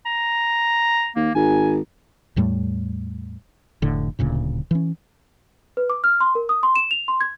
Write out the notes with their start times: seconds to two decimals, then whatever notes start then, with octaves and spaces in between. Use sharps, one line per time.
0.06 A#5
1.16 D#2 A#3
1.35 G#1 G#5
2.36 E2 A2 G3 A3
3.82 F1 A2 D3
4.19 D1 D2 A#2 C#3
4.71 E3 C#4
5.77 B4
5.90 D6
6.04 F6
6.21 C6
6.35 A#4
6.49 D#6
6.63 C6
6.76 E7
6.91 F7
7.08 C6
7.21 G#6